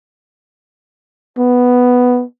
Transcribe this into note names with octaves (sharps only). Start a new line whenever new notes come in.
B3